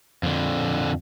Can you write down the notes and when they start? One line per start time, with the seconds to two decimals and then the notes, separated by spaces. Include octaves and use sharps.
0.23 F2 D3